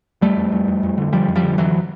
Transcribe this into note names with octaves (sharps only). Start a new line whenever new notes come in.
F2 G3 A3
F2
F2
F2
F2
D3
F2 F3 G3
F2
F3 G3
D3
F2 E3 F#3